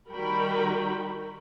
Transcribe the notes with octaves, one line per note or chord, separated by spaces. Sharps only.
D#3 G3 F#4 A#4 G5 B5